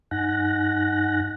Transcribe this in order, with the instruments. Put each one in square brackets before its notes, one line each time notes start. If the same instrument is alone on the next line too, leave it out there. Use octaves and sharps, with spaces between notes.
[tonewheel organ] G2 D#4 F#5 G#5 F#6 A#6